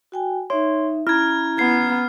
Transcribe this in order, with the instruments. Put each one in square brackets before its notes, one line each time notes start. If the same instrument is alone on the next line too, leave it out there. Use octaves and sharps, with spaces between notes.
[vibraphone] F#4 G5 G#5
[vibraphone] D#4 E5 [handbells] C#5 C6
[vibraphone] C#4 A#5 [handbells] E4 [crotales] F6 G#6
[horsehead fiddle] B3 [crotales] G#6 C7